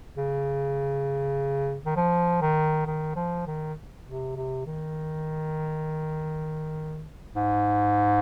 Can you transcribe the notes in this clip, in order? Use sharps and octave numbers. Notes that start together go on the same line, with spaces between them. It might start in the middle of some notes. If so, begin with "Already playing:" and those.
C#3
D#3
F3
D#3
D#3
F3
D#3
C3
C3
D#3
G#2